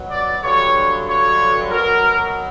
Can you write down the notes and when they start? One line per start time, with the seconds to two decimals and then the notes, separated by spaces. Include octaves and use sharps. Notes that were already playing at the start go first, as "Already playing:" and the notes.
Already playing: B2 F#3
0.11 D5
0.43 G2 D3 F#3 C#5
1.08 C#5
1.71 B2 F#3 A#4